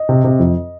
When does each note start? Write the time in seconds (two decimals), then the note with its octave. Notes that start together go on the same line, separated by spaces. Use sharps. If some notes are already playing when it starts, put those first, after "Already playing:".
Already playing: D#5
0.09 C3
0.24 C3
0.39 F2